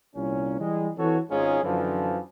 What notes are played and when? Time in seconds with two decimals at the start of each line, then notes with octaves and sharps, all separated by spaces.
0.16 C2 A#2 C#4
0.59 E3 G3 G#3
0.97 E3 C4 F#4 A4 C#5
1.30 G#1 G#2 C#4 F4 G#4
1.63 F#2 D3 E3 F3